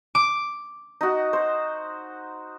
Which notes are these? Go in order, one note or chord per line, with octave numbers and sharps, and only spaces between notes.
D6
D#4 F#4
C5